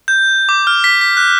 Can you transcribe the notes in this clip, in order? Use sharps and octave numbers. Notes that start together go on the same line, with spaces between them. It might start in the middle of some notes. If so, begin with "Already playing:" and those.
G6
D6
F6
B6
B6
F#6